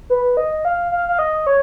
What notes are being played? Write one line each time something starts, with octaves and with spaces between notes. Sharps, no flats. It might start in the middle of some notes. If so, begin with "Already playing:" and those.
B4
D#5
F5
F5
F5
D#5
C#5